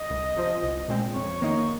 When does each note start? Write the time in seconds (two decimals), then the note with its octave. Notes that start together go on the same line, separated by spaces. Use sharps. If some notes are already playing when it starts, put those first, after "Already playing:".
Already playing: D#5
0.10 C2
0.36 C3 F3 C4
0.63 C2
0.88 A#2 G#3 C4
1.14 F2 C#5
1.40 D#3 A#3 D#4 C#5